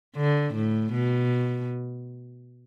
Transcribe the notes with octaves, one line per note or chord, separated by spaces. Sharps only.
D3
A2
B2